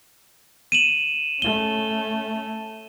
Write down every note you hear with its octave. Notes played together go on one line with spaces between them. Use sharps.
D#7 E7 F#7
A3 C#4 G7